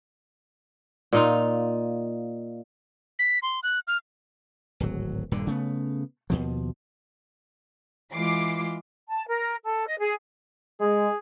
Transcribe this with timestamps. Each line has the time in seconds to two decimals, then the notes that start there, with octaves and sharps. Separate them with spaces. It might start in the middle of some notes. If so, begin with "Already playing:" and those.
1.13 A#2 D#4 F4
3.19 B6
3.42 C6
3.63 F#6
3.88 F6
4.80 D1 G#1 F#3
5.32 D#1 G2 A#2 D3
5.47 C#3 A3 B3
6.30 D#2 B2 F3
8.13 E3 G#3 F4 D6 C7
9.09 A5
9.29 A#4
9.64 A4
9.87 D#5
10.00 G#4
10.81 G#3 G#4